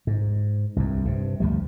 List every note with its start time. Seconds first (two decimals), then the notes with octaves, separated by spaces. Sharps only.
0.07 G#2
0.76 C2 G2
1.05 G2 C3
1.40 D2 F3 G3